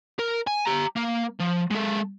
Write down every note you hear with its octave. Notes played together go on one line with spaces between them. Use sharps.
A#4
G#5
G4 A#5
A#3
F3
G#3 A4